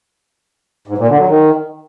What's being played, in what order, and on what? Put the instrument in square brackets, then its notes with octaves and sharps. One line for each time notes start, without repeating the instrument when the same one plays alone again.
[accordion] G#2
A#2
D3
F#3
D#3